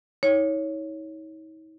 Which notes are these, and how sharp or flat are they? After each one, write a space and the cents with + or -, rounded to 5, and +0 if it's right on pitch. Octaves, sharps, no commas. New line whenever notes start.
D#4 +45 C#5 +0